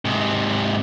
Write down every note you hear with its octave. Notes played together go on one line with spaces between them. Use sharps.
G#2 C3